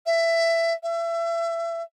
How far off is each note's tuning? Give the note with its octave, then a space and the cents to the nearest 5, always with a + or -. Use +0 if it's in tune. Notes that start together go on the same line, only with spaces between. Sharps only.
E5 +15
E5 +30